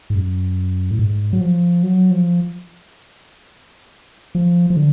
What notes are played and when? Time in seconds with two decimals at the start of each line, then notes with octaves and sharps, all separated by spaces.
0.10 G#2
0.15 F#2
0.91 A2
0.99 G#2
1.33 F#3
1.41 F3
1.83 F#3
2.11 F3
4.35 F3
4.70 F3
4.77 D3